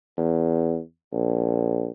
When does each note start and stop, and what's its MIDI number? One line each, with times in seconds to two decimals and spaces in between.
0.18 0.79 40
1.12 1.90 34